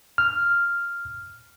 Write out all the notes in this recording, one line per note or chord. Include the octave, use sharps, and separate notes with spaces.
F6